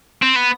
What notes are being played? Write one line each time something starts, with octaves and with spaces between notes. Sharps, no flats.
C4
B3